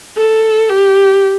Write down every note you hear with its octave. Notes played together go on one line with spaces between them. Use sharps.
A4
G4